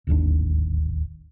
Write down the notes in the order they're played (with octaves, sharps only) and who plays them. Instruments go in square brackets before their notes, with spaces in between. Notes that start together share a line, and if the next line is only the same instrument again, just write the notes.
[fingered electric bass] D1 G#1 D#2 D4